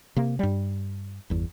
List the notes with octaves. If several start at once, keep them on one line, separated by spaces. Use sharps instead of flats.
C3 A#3
G2 G3
G1 E2